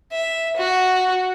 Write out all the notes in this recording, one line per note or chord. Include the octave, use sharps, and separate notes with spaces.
E5
F#4